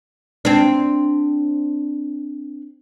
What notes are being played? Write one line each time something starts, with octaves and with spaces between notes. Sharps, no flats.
C4 D4